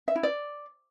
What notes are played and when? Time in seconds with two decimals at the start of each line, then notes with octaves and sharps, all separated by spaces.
0.08 E5
0.16 E4
0.23 D5